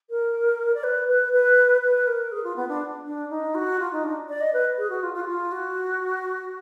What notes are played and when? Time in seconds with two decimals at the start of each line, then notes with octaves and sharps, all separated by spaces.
0.10 A#4
0.74 D5
0.83 B4
1.08 B4
1.33 B4
1.82 B4
2.07 A#4
2.32 G#4
2.44 F4
2.56 B3
2.68 D4
3.05 D4
3.29 D#4
3.55 F#4
3.80 F4
3.92 D#4
4.04 D4
4.29 D5
4.41 D#5
4.53 B4
4.78 G#4
4.90 F#4
5.03 F4
5.14 F4
5.22 F#4
5.27 F4
5.52 F#4